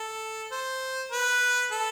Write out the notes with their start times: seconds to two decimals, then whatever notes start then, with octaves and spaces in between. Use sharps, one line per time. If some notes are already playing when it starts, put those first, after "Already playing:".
Already playing: A4
0.52 C5
1.11 B4
1.71 A4